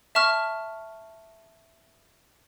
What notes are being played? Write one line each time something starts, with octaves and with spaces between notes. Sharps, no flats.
E5 A5 C#6 F6